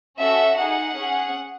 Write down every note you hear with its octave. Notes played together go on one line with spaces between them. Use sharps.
C#4 F#4 A4 E5
D#4 G#4 F#5
C#4 G#4